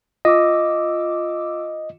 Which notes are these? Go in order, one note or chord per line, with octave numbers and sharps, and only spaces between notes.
F4 D#5 D6 E6